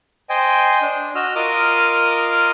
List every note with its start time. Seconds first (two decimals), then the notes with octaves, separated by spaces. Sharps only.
0.30 C5 D#5 G5 G#5
0.82 D4
1.15 F#4 D#5 E6 F6
1.35 F4 A#4 D#5 D6 D#6 F6